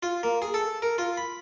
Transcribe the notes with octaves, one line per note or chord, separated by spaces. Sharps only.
F4
A#3
G#4
A4
A#4
F4
B5